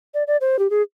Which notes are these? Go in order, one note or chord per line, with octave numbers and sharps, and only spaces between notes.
D5
D5
C5
G4
G#4